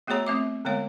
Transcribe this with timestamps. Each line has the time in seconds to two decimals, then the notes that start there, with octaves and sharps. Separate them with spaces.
0.07 A3 B3 F#4 G#4 C#5 A#5
0.27 A3 C4 E5 D6
0.65 D3 G#3 B3 C#5 F5